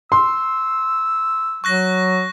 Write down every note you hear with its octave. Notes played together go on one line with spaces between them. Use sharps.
C6 E6
F#3 C#6 F#6 A#6